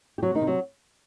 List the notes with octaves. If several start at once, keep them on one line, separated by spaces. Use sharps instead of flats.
G4
C3 F#3 F#4
D#3 D#4
C3
F#3 F#4